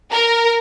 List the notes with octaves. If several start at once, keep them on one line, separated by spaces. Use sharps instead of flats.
A#4